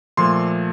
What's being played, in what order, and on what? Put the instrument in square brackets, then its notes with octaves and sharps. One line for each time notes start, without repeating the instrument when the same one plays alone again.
[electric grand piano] A#2 F3 A3 C6